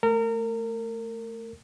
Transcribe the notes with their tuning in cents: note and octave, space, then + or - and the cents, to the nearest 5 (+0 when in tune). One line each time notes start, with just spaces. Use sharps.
A3 +0 A#4 -30